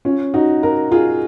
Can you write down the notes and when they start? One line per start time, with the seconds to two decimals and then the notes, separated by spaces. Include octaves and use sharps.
0.05 C#4 F4
0.34 D#4 F#4
0.63 F#4 A#4
0.92 F4 G#4